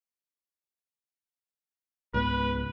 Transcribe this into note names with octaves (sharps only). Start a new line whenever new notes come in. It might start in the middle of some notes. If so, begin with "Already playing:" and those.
C#2 G#2 B3 B4